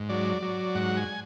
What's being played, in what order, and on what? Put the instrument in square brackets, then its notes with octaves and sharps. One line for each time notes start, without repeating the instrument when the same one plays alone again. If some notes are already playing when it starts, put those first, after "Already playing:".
Already playing: [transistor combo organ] G#2
F#3 D5
F#3
G#2 F#5
G#5